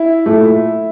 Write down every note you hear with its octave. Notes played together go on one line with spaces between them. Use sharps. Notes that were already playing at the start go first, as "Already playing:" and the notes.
Already playing: E4
A#2 A3